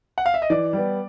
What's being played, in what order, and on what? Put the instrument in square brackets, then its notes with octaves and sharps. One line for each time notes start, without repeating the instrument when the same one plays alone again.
[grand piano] F#5
F5
E5
D#5
[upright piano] E3 [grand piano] D5
[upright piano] G3 B3